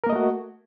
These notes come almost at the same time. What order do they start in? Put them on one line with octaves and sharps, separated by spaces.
A#4 A#3 D#5 A3 F#4